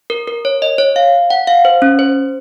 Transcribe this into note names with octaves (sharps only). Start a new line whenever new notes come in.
A#4
A#4
C#5
D#5
C#5
F5
F#5
F5
C5
C#4
C5